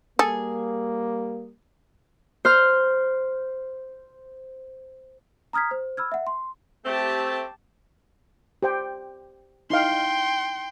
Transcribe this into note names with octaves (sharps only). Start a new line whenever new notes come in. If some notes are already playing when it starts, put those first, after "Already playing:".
G3 A#3 G#4 A4
C5 F6
A#5 D#6 F6 G#6 B6
C5
B5 E6 F6 G#6
E5 F#5
C6
A3 C4 G4 A5
G4 C5 G5
D#4 E4 F5 G5 C6